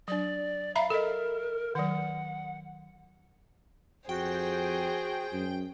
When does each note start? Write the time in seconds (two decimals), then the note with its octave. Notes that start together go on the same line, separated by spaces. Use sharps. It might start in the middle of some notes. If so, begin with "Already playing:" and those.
0.08 F#3 D4 D5
0.76 E5 F5 A#5 B5
0.90 A4 A#4 D#5
1.75 D#3 F#3 F#5
4.09 F2 F#4 G#4 C5 G5
5.33 F#2